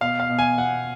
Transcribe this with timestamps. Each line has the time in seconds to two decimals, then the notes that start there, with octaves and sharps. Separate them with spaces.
0.01 B2 F5
0.20 F5
0.29 B2
0.39 G#5
0.57 B2 F#5